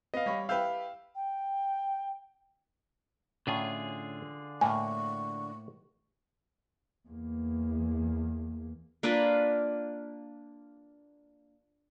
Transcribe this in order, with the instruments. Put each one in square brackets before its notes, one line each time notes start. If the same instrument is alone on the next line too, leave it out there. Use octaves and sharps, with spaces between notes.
[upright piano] B3 [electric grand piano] D#5 F5
[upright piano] G3 C#5 B5
[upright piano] E4 G4 B4 [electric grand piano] F5 E6 G6
[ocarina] G5
[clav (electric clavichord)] A2 C#4 D4 [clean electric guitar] D3 F4 G#4
[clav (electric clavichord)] A2 A#3 [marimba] G#5 [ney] C#6
[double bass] E2 A#3
[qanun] A#3 D4 F4 B4